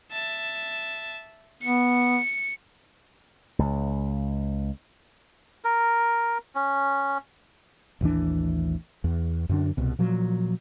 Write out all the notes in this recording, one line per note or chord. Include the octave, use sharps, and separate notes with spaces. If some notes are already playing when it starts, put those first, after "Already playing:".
E5 A5
B3 C#7
C#2
A#4
C#4
A1 D#2 E3 D4
E2
F#2 D3 D4
C2 B2
A#2 F3 F#3